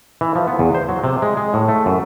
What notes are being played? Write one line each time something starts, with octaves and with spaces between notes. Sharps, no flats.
E3
F3
B3
E2
C5
F#3
C3
G#3
G#3
A2
A3
F#2